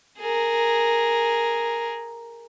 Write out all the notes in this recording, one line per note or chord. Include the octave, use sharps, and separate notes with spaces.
G#4 A#4